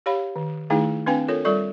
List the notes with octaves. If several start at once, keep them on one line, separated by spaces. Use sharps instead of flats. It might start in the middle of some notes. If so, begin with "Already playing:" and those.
G4 C#5 F5 B5
D#3
D#3 A3 D#4 E4 G#4 F5
C4 D4 B4 F5 G5 G#5
F4 A4 A#4 C#5
G3 F4 A4 D5 C#6